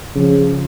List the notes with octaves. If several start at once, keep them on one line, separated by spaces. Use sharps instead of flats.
C#3 F3